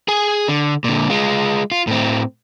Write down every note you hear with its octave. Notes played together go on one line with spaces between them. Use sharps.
G#4 G#5
D3
A#2 D3
G#3 F4
F4
A2 C4